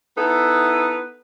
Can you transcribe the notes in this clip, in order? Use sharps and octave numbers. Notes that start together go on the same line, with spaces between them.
B3 D#4 E4 A4 B4